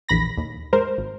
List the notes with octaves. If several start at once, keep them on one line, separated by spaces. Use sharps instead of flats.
A#1 E2 B5 A#6
D#2
G#2 A#4 C5
G#1